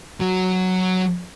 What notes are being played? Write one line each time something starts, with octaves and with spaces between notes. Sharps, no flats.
F#3 F#4